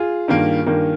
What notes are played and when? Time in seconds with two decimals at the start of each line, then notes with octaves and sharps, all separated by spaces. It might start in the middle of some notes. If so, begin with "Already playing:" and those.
Already playing: F4 G#4
0.28 G2 D#3 A#3
0.66 G2 D#3 A#3